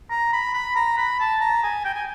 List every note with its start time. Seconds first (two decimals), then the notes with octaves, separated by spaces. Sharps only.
0.11 A#5
0.33 B5
0.54 B5
0.76 A#5
0.97 B5
1.20 A5
1.41 A#5
1.64 G#5
1.85 G5
1.94 G#5